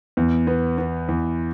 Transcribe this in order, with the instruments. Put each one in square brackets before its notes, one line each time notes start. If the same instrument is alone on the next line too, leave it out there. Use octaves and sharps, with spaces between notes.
[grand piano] E2
B3
B3
E2